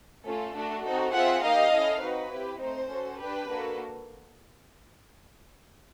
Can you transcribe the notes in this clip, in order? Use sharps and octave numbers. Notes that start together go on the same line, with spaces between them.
A3 C#4 F4 A4
A3 D4 F#4 A4
C4 D#4 F#4 A4
C4 F4 G#4 E5 F#5
A#3 D#4 G4 D#5 F5
C#4 E4 A4
C4 D#4 F#4 B4
C4 E4 G4
A3 C4 D#4 C5
C#4 F#4 A4
D4 G4 B4
A#3 D4 F#4 A4